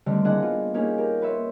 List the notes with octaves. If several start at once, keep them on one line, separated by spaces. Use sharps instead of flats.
D3 D#3 G3 A3 C4
A#3 D4 E4 G#4 D#5 F#5
B3 F4
A#3 C#4 D#4 G4 G#4
G4 A#4
B4 C#5 E5 C6